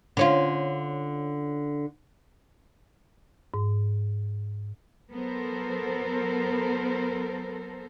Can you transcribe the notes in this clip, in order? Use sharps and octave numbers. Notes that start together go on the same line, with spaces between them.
D3 C#4 F4
G#2
F#3 B3 A4 A#4 C5